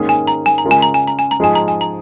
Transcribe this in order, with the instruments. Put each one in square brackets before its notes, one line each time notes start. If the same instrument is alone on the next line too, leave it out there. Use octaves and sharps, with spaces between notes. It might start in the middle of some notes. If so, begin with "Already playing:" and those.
Already playing: [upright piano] G#2 D#3 A#3 C#4 G#4
[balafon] G#5
A#5
G#5
A#5
[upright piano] C#3 G#3 F4 A#4
[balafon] G#5
A#5
G#5
A#5
G#5
A#5
[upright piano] G#2 F3 G#3 D#4 G#4 [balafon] G#5
[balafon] A#5
G#5
A#5